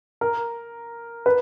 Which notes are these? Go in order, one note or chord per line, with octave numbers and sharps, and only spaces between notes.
A#4
B4